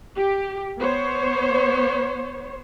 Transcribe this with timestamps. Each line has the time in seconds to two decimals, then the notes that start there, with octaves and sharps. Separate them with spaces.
0.16 G4
0.78 B3 C5 C#5